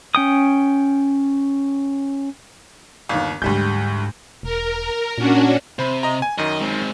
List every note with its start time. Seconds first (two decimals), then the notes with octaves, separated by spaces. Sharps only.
0.15 C#4 G5 D#6
3.09 G1 D#2
3.42 D2 G#2 E3 G3 G6
4.43 E1 A#4
5.18 A#2 C#4 D4 F#4
5.79 C3 C5 B5
6.03 D#5 A#5
6.22 G#5
6.38 F#2 D#3 D#5
6.61 G#3 C4